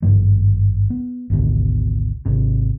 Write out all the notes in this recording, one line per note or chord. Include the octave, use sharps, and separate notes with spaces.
G#1 G2 F3 A3
B3
G#1 D2 B2
G#1 C3